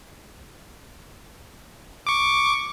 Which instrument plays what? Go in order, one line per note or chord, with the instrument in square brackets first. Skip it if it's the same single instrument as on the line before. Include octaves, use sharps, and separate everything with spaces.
[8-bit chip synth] C#6 D6